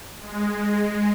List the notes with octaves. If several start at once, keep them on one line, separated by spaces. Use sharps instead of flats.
G#3